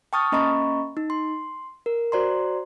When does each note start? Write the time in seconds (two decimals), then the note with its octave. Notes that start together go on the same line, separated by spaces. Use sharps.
0.13 G5 A5 C#6 D#6 F6 A6
0.32 A#3 C#4 D#5 A#5 B5 C#6
0.97 D#4
1.10 C6
1.86 A#4
2.12 F#4 C5 D5 A#5 C6